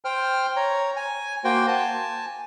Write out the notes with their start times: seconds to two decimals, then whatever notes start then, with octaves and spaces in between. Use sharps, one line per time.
0.05 C5 G5 F6
0.56 C#5 A#5
0.96 G#5
1.44 A#3 F#4 C5 G5
1.68 G#5 A5